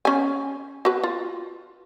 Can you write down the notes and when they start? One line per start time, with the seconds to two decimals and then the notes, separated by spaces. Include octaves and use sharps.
0.05 C#4 G#5
0.85 F#4 B4
1.04 F4